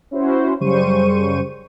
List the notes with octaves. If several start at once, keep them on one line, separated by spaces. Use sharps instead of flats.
C#4 E4 F#4 C5
F#2 C#3 G3 C5 C#6 D#7